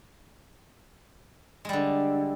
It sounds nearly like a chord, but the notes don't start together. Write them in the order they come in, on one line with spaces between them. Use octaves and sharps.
G#3 G3 D3